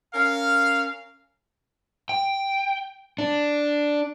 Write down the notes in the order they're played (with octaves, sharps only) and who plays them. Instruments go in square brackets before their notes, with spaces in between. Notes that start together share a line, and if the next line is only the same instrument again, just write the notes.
[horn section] C#4 A#4 F5
[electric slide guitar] G5
D4